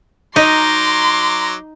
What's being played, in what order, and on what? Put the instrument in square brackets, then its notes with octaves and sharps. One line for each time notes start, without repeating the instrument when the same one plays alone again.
[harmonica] F#3 A#5 D6 [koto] D#4 [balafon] D#5 [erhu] C6